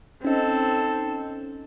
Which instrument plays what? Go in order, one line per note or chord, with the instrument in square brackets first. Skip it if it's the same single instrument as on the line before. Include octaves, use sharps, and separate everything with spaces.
[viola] C4 A4 [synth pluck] C#4 D#4